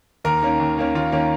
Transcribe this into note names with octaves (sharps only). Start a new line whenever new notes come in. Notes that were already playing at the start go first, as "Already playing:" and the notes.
D#2 A#4
D#3 A#3 C#4
D#2
D#3 A#3 C#4
D#2 F4
D#3 A#3 C#4